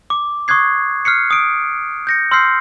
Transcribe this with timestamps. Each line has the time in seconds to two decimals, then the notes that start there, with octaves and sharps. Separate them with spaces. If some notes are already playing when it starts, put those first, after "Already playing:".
0.10 D6
0.48 C#6 D#6 F#6 G#6 C7
1.05 F6 F#6 C7 C#7
1.31 D#6 D7
2.07 G6 A#6 C#7
2.31 C6 E6 F6 G6 C7